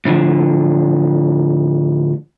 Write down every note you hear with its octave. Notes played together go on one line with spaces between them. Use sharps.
A2 D3 E3 F3